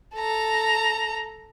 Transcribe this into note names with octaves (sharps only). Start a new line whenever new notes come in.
A4 A#5